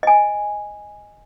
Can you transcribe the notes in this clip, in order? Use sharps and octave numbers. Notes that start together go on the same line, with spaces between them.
D#5 G#5